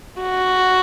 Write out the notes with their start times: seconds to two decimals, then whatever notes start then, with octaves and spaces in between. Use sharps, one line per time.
0.22 F#4